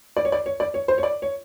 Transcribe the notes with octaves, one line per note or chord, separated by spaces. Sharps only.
D5
C#5
D5
C#5
D5
C#5
C5
C#5
D5
C#5